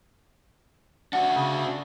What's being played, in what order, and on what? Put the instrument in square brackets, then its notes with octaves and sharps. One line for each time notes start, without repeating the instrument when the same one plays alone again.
[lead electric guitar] D4 F#4 [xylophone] F#5
[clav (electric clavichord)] C#3